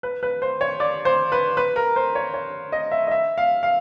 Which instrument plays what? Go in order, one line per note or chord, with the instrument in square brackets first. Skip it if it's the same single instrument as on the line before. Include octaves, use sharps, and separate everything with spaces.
[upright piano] B4
B4
C5
C#5
D5
C5
B4
B4
A#4
C5
C#5
C#5
D#5
E5
D#5
E5
F5
F5